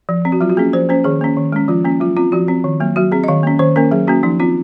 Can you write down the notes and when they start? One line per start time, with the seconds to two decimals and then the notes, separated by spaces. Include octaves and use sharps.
0.09 F3
0.25 C4
0.32 F#4
0.41 F#3 F4
0.49 F#4
0.57 A#3 C#4 G#4
0.73 F3 C5
0.89 A#3 C#4 C5
1.04 D#3 G#4
1.21 A#3 C#4
1.37 D#3
1.52 G#3 C#4
1.68 F3 F4
1.85 A#3 C#4
2.00 F#3 F4
2.17 C4 F4
2.32 F3 F#4
2.48 C4
2.64 D#3
2.80 F#3 A#3
2.96 F#3 F#4
3.12 C4 G#4
3.24 D#5
3.28 D#3 F5
3.43 A#3 C#4
3.59 D#3 C5
3.76 A#3 C#4 A#4
3.91 F#3 G#4
4.07 A#3 C#4 F#4
4.23 F3 D#4
4.40 C4 F4